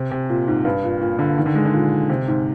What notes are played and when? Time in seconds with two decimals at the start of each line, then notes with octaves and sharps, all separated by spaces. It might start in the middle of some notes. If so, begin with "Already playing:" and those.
Already playing: C3
0.11 C3
0.29 A#2
0.48 G#2
0.65 G2
0.84 A#2
1.01 A#2
1.19 D3
1.38 D#3
1.46 D3
1.55 G#3
1.65 D3
1.74 A#2
2.09 C3
2.28 G#2